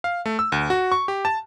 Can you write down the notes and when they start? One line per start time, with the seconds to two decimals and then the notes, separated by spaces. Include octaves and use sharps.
0.04 F5
0.26 A3
0.39 E6
0.52 D2
0.70 F#4
0.92 C#6
1.08 G4
1.25 A5